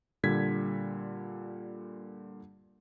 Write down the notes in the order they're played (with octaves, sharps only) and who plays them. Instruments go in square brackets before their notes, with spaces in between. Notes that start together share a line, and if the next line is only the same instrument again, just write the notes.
[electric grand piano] A#2 D3 G3 G#6 B6